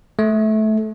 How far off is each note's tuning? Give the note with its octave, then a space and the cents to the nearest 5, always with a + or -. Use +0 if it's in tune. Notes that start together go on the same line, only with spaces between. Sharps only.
A3 -20